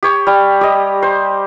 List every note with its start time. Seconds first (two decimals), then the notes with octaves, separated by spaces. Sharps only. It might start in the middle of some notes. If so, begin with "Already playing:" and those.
0.03 G4 C#5
0.27 G3
0.61 G4 D#5
1.02 C5